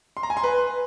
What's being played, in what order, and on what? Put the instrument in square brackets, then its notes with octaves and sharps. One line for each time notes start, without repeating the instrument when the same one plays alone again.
[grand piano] C6
A#5
G#5
C6
B4